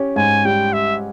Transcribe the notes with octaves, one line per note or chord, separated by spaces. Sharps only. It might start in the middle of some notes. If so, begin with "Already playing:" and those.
Already playing: C#4 G4
G#2 G#5
G3 G5
G4 E5